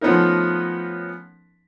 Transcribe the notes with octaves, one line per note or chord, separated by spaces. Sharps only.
F3 A3 B3 C#4 D#4 A#4